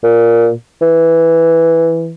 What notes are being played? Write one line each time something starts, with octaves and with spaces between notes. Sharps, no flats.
A#2
E3